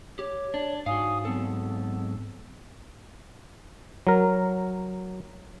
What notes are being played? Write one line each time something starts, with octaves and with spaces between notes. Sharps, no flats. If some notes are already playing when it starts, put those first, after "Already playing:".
G4 C#5
D4
G#2 F#4 F5 G#5 D#6
F#3 B3 C4 A4
F#3 A#4